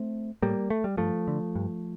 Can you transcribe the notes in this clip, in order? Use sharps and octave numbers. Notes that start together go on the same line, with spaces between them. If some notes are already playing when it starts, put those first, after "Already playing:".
Already playing: A3 C4
A2 G3 A#3
A3
G3
G2 F3 A3
D3
G2